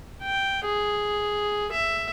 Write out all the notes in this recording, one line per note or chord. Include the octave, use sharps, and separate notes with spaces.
G5
G#4
E5